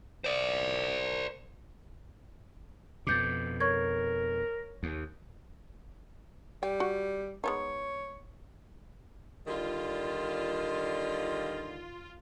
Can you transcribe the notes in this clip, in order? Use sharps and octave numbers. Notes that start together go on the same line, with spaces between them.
C5 D5
F2 B2 D6 G6 A6
A#4 C#5 C#6 G#6
D#2
G3 G5
F#4
G#3 B3 D#4 C#5
D3 D#3 G3 F4